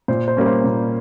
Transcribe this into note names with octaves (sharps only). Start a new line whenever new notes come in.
A#2 C5
C5
G3 A#3 C#4
C5
A#2